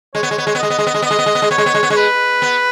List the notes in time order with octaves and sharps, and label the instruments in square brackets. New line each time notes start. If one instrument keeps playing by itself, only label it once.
[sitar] G#3 [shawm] C#5
[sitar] B3
G#3
B3
G#3
B3
[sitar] G#3 [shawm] D#5
[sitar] B3
G#3
B3
G#3
B3
[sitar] G#3 [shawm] D#5
[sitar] B3
G#3
B3
G#3
[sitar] B3 [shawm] C#5
[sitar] G#3
B3
G#3
B3
[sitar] G#3 [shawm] C#5
[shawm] B4
[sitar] B3